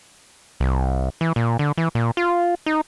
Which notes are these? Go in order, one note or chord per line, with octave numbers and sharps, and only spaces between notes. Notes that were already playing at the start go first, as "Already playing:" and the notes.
C2
E3
A#2
D3
E3
A#2
F4
D#4